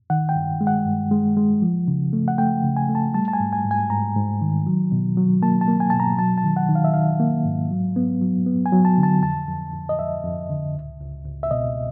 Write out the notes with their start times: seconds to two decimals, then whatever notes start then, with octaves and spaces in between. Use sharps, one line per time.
0.10 D#3 F#5
0.29 G5
0.36 G2
0.61 G#3
0.67 F#5
0.86 G2
1.11 G#3
1.37 G#3
1.62 F3
1.88 C#3
2.13 A3
2.28 F#5
2.38 A3 G5
2.64 C#3
2.77 G#5
2.89 A3
2.95 A5
3.14 G3 A5
3.28 A5
3.33 G#5
3.40 G#2
3.53 G#5
3.65 G#2
3.71 G#5
3.90 G#2 A#5
4.16 G#2
4.42 D#3
4.67 F#3
4.92 B2
5.17 F#3
5.42 A#3 A5
5.61 A5
5.68 A#3
5.80 G#5
5.90 B2 A5
6.00 A#5
6.19 F#3 A5
6.38 A5
6.44 D#3
6.57 F#5
6.69 D#3
6.75 F5
6.84 E5
6.94 D#3 F5
7.20 A#3
7.45 G#2
7.71 F#3
7.96 B3
8.21 F#3
8.46 B3
8.66 G#5
8.72 F#3
8.85 A5
8.98 D3
9.03 A5
9.23 F2 A5
9.48 F2
9.74 F2
9.89 D#5
9.99 F2 E5
10.24 F2
10.49 D3
10.75 C#2
11.00 C#2
11.26 C#2
11.43 E5
11.51 B2 D#5